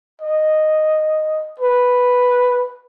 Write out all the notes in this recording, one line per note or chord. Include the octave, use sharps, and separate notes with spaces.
D#5
B4